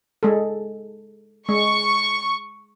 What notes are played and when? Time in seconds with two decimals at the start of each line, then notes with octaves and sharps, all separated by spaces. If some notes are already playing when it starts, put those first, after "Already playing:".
0.23 G#3 A4
1.49 G#3 C#6